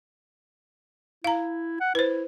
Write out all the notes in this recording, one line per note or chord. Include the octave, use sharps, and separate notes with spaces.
E4 F5 A#5
F#5
E4 B4 C5